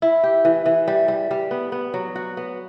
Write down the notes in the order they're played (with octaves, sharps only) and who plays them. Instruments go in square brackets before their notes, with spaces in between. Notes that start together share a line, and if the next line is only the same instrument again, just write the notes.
[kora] E4
G4
E3
E3
G3
G3
G3
B3
B3
F#3
F#4
B3